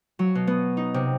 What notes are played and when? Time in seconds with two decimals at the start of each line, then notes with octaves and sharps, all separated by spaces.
0.19 F#3
0.35 B2
0.47 B3
0.77 D#4
0.94 C3